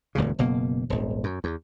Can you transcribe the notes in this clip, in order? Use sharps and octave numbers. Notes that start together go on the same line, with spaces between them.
E1 D2 G2 C#3
F#1 B2 A#3
D#1 G#1
F#2
E2